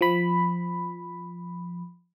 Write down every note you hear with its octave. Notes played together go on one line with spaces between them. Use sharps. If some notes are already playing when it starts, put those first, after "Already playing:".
F3 B5